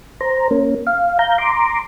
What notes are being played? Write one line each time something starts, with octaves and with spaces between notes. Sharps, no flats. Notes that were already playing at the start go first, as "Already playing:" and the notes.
C5 A#5
A#3 C#4
F5
F5 A#5 G6
A#5 C6 D6